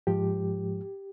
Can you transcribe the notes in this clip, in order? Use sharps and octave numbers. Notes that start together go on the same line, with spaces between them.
G#2 F3 G#3 G4